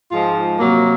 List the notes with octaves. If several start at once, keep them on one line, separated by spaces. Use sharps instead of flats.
G#2 F3 G#3 F4
C3 F#3 A#3